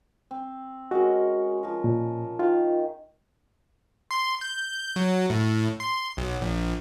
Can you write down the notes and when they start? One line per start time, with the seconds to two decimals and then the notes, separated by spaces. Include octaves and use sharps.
0.31 C4
0.91 G#3 C#4 F#4 A#4
1.63 F3 A#4
1.84 A#2
2.39 D#3 F4
4.11 C6
4.41 G6
4.96 F#3
5.30 A2
5.80 C6
6.17 B1
6.41 A#1